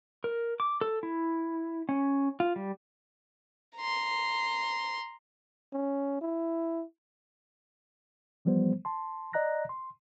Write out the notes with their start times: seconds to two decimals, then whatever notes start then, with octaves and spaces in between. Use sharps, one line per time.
0.24 A#4
0.60 D6
0.81 A4
1.03 E4
1.89 C#4
2.40 F4
2.56 G3
3.77 A#5 C6
5.73 C#4
6.21 E4
8.45 E3 F3 G3 B3 C5
8.85 A5 C6
9.33 D5 D#5 A#5 F#6 A#6
9.69 C6